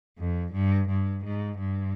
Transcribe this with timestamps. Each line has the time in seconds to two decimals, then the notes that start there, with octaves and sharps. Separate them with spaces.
0.18 F2
0.53 G2
0.88 G2
1.24 G#2
1.58 G2